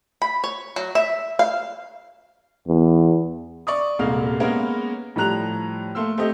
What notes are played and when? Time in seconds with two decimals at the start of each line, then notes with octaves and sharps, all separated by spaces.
0.22 B5
0.44 C#5
0.76 F#3
0.95 E5
1.39 F5
2.68 E2
3.67 D5 C#6 D#6
3.99 D#1 C2 G#3 A#3 D#5 F5
4.40 G#3 A#3 B3 C#4 A#4 C#5
5.16 A2 F3 G3 A#5 F#6 F7
5.95 A3 A#3 C6 E6
6.18 A3 C4 G4 D#5